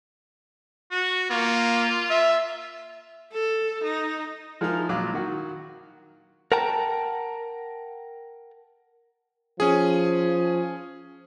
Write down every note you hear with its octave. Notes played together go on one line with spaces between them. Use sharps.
F#4
A#3 F4
E5
A4
D#4
F3 G#3 D#4 E4 A#4 F5
A#1 A#2 F#3 F4 F5 D6
D#3 F#4
A#4 F#5 G5 A5 A#5
F3 C#4 G#4